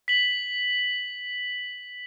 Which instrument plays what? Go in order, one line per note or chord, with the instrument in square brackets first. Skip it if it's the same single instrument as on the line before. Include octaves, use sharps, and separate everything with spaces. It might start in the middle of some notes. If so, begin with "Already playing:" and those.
[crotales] B6 F#7